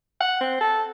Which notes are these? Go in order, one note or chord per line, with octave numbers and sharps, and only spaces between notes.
F#5
C4
A4